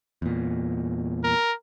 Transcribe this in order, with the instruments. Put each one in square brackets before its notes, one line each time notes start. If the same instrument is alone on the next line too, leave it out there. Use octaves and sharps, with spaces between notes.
[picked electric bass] E2 A#2
[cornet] A#4